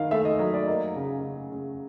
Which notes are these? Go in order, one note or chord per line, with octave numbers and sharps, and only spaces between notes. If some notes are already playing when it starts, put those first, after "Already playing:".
Already playing: D#3 F5
A3 E5
D#5
F#3 D#5
D5
A#3 D#5
C#3
C#3
C#3